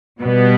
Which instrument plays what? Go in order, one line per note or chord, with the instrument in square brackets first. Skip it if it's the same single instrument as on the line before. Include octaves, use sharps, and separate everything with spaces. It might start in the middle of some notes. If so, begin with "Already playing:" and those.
[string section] B2 G3 B3